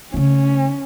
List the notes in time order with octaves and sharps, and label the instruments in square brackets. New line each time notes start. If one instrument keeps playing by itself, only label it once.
[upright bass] C#3 A3 [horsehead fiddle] C#4